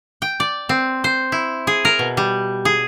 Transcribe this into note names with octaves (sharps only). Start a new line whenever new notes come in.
G5
D5
C4
C5
E4
G#4
A#4
B2
G3
G#4